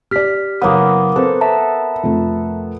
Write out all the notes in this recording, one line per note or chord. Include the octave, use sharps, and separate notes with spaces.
G4 D5 F6 B6
F#1 A#3 B3 C#5 D#6
C4 A4 B4 C5
E5 A5 A#5
F2 C3 A3